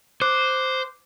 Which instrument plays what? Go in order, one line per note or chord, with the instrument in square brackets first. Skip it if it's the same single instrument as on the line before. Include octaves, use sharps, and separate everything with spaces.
[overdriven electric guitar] C5 [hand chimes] D6 F#6